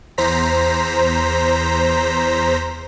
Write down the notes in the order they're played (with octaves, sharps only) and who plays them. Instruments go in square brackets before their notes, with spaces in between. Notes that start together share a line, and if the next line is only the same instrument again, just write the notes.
[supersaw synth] E2 C5 A#5 B6